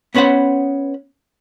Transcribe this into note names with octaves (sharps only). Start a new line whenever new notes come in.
B3 C#4 B4 C5 F#5